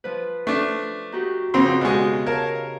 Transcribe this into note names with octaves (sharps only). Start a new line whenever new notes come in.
F3 B4
A3 D4
D#4 F#4 G4
F2 C#3 B3 C4 C6
B2 G#3 G4 D#5
A#4 C#5 F5 A5